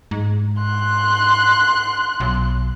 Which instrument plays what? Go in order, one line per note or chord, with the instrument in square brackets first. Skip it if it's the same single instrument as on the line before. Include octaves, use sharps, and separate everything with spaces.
[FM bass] G#2
[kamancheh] C6 F#6
[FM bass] B1